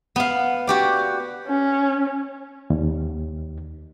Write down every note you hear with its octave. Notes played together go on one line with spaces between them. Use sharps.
B3 F5
F#4 G4 D5
C#4
D#2